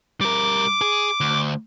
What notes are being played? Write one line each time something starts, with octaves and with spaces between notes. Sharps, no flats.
G3 A#4 D6
G#4
D2